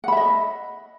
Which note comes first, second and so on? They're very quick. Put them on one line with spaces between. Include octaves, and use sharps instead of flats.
F#5 B5 E5 D#5